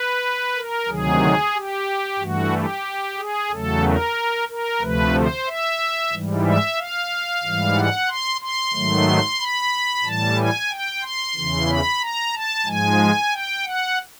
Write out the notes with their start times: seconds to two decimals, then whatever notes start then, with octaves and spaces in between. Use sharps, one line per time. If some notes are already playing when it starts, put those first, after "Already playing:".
Already playing: B4
0.56 A#4
0.88 D2 C3 D#3 F#3 G#4
1.55 G4
2.19 G2 E3 A3 F#4
2.52 G4
3.18 G#4
3.50 E2 C#3 F#3 A3 A4
3.84 A#4
4.49 A#4
4.81 D2 C3 F3 A3 B4
5.14 C5
5.46 E5
6.13 G#2 E3 G3
6.45 E5
6.77 F5
7.43 G#2 E3 G3
7.75 F#5
8.09 C6
8.41 C6
8.73 G#2 D#3 F#3 A3
9.40 B5
10.04 A2 E3 G3 A5
10.38 G#5
10.70 G5
11.02 C6
11.35 E2 C#3 E3
11.68 B5
12.00 A#5
12.34 A5
12.66 G#2 F3 G#3 G#5
13.31 G5
13.64 F#5